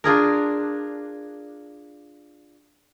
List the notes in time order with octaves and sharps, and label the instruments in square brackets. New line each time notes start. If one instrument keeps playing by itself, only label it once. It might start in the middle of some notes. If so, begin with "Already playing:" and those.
[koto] D4 F4 G#4 A#4